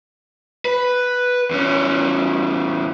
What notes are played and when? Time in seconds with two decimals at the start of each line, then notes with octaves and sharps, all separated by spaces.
0.65 B4
1.51 E2 C#4